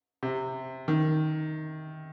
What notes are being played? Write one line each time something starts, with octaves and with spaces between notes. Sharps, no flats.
C3
D#3